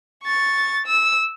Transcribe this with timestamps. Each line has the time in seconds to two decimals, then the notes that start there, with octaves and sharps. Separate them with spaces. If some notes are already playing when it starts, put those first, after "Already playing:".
0.24 C#6 A6
0.86 E6